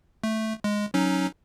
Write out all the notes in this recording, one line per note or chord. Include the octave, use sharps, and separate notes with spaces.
A3
G#3
F#3 C#4 D#4